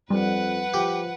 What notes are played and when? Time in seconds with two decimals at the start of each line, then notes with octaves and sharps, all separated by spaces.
0.10 F2 G3 B4 F#5
0.74 F3 G4